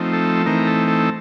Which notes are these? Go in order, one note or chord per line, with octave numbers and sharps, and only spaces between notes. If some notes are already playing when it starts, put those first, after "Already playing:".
Already playing: F3 A3 C4 D#4
A4
E3 A3 C4 D#4 A#4
A4
A4